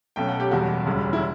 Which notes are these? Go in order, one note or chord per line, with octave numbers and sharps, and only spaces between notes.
B1 B2 A3 C#4 G5
F#5
G4
F#1 E2 B2 G3 F#4
E1 D2 C#3 G3 C#4
E4